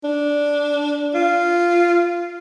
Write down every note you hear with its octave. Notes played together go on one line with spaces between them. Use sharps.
D4
F4